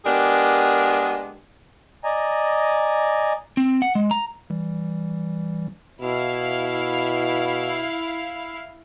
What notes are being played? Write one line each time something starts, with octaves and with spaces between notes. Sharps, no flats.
G#3 B3 D4 G4 G#4 A#4
D5 D#5 G#5 A#5
C4
F#5
G#3
A#5
E3 G3
B2 E4 F5